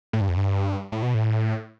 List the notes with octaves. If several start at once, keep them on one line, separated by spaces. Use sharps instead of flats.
A2
G2
F2
G2
A2
B2
A2